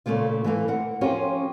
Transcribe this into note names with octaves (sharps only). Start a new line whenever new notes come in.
A#2 C#3 A3 A#3 F4
E3 F3 A3 A#3
A#4 F#5
F3 C#4 F4 G4 A#4 C#5